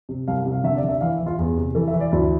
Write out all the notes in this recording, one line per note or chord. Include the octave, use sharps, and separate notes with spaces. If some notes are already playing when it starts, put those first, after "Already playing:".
C3
C2 F5
C3
F5
D3 E5
D5
D3
E5
E3 F5
E5
E3
F4
E2 G#4
C3
E3 A4
E5
E3
D5
D2 E4